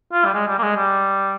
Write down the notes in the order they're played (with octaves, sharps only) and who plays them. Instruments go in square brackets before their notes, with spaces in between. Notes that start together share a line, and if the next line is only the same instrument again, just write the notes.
[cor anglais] F4
G3
G#3
G3
A#3
G#3
G3